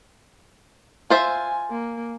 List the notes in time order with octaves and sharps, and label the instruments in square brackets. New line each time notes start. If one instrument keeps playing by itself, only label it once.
[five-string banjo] F4 C5 E5 [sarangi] G#5
[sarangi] A#3